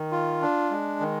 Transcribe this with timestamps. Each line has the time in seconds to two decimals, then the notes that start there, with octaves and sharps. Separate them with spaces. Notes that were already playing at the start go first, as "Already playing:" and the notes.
Already playing: D#3
0.12 F4
0.42 D4
0.71 G#3
1.00 D#3